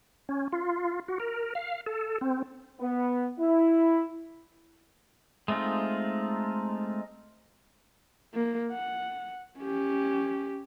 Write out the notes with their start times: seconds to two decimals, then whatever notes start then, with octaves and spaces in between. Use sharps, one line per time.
0.29 C#4
0.52 F4
1.08 F#4
1.20 A#4
1.55 F5
1.86 A4
2.21 C4
2.81 B3
3.39 E4
5.48 G#3 A3 C4 D#4 F4
8.34 A#3
8.71 F#5
9.59 C#4 G4